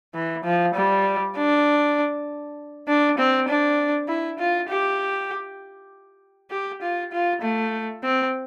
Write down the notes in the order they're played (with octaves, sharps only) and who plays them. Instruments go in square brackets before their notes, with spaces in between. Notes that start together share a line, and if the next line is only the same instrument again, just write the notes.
[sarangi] E3
F3
G3
D4
D4
C4
D4
E4
F4
G4
G4
F4
F4
A3
C4